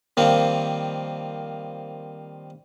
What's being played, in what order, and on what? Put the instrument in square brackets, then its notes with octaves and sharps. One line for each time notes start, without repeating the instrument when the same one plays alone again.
[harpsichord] D#3 F3 G3 A#3 C4